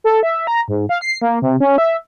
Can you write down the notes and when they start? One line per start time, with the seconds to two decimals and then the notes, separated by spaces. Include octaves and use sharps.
0.04 A4
0.23 E5
0.47 A#5
0.68 G#2
0.89 F5
1.01 C7
1.22 A#3
1.42 C3
1.60 C#4
1.78 E5